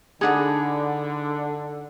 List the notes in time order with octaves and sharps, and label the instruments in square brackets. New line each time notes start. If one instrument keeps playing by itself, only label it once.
[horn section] D3 [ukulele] D4 G#4 [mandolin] D#4 F#5 B5